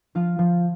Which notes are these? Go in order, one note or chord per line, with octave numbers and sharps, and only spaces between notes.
F3 F4
F3